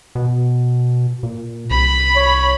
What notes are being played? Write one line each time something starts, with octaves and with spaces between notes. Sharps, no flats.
B2
A#2
C2 B5
C#5